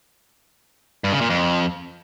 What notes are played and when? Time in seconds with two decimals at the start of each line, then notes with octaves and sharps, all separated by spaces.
1.04 G2
1.13 C#3
1.21 A#2
1.30 F2